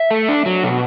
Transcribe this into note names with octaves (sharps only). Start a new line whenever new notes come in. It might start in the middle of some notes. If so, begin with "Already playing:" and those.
Already playing: E5
A3
D4
F#3
B2